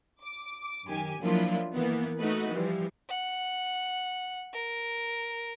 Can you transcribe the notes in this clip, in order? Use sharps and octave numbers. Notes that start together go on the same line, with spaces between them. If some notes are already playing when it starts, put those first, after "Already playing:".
D6
F#2 D#3 G4 G#5
F3 F#3 A#3 D4 E4 F4
E3 A#3 B3
A3 D#4 F#4 B4 D#5
E3 F3 G3
F#5
A#4